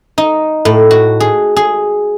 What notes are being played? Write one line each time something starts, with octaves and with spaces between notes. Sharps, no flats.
D#4
A2
F#4
G#4
G#4